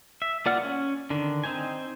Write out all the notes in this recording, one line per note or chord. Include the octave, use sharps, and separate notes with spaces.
E5
A#3 F4 D5 F#5 F6
C#4
D3 D#3 D4
C4 D#4 C5 G#5